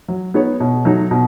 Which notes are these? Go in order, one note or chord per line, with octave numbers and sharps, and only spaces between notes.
F#3
B3 D#4 G#4 C#5
B2
F#3 A3 D#4
B2